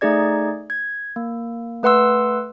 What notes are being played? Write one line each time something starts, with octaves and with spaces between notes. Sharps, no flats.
A3 D#4 G#4 D5 G#6
G#6
A#3
A3 B4 F#5 C6 E6